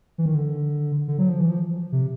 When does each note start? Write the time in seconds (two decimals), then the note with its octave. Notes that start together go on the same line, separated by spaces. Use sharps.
0.18 E3
0.26 D#3
0.35 D3
1.08 D3
1.19 F#3
1.29 F3
1.39 E3
1.49 F3
1.92 C3